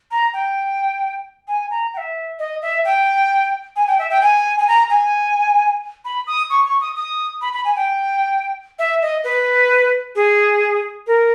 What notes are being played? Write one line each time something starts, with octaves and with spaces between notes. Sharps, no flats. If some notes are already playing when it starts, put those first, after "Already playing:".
A#5
G5
G#5
A#5
G5
E5
D#5
E5
G5
G#5
G5
E5
G5
G#5
G#5
A#5
G#5
B5
D#6
C#6
C#6
D#6
D#6
B5
B5
G#5
G5
E5
D#5
B4
G#4
A#4